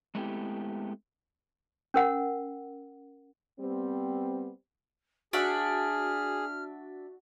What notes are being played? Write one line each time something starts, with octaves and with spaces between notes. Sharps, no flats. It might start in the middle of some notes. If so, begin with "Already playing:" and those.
G#3 A3 B3 C4 E4 G4
C#4 A#4 F#5
G3 B3 C4
D4 F#4 G#4 E5 F#5 F6